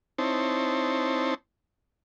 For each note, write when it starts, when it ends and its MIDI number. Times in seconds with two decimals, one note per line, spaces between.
0.18 1.34 60
0.18 1.34 63
0.18 1.34 64
0.18 1.34 72
0.18 1.34 73
0.18 1.34 81